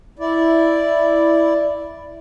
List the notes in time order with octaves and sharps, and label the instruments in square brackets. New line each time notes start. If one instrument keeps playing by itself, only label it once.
[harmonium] E4 D5